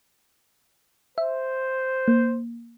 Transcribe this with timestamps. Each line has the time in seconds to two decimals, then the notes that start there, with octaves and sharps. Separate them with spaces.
1.18 C5 E5
2.08 A#3